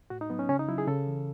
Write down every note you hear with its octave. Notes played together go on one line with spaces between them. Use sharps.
A2 F#4
D#4
F#3 B3
C#4
C#3 C#4
D#4
F#3 E4
G#4
C#3 A4
E3